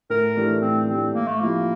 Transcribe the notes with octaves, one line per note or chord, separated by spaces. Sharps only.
A2 A#4
E3 A3 D4 G4
A2 C4
E3 A3 C4 D4 G4
A2 A#3
A3
F3 A#3 C4 E4 G4